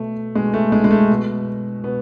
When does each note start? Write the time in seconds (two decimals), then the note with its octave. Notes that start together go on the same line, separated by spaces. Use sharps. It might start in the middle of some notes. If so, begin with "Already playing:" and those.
Already playing: B2 A3
0.35 B2 G#3
0.54 A3
0.72 G#3
0.84 G#3
0.91 A3
1.10 B2
1.83 B2 B3